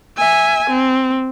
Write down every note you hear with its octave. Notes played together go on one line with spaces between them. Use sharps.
E5 G#5
C4